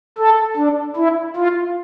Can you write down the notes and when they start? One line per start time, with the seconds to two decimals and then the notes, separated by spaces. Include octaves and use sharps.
0.18 A4
0.57 D4
0.96 E4
1.36 F4